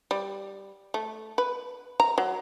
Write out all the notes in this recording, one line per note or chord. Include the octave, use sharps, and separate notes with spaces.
G3
A3
B4
A#5
F#3